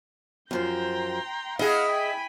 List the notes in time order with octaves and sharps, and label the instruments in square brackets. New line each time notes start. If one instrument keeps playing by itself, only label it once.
[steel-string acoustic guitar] F#2 F3 C5 [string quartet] G5 A#5 C6
[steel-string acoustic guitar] E4 [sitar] G#4 D#5 [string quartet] F5 F#5 F6
[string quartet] G5 G#5 B5